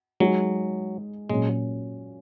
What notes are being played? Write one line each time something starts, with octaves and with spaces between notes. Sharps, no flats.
F#3 G#3 D#4 G#4
A#2 F#3 G#3 C#4